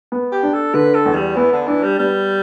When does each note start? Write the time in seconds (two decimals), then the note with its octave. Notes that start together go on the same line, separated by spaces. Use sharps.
0.12 B3
0.32 G4
0.43 D4
0.54 A4
0.74 D3 B4
0.95 A4
1.06 E2
1.15 G3
1.36 E3 B3
1.52 D3
1.67 E3 D4
1.83 G3
1.99 G3 B3